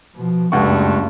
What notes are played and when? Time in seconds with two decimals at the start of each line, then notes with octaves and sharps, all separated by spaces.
0.15 B2 F3
0.52 F#1 C#2 G2 A3 F#5 C#6